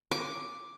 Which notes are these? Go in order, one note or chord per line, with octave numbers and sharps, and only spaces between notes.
D6